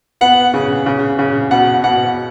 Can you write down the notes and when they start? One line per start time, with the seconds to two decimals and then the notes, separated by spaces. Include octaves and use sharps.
0.21 B3 F#5
0.54 C#3
0.86 C#3
1.19 C#3
1.51 B2 F#5
1.84 B2 F#5